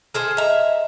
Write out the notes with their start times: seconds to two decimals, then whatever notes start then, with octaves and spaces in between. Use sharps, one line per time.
0.14 G#4 A4 C5 F6
0.37 D#5 E5 A#5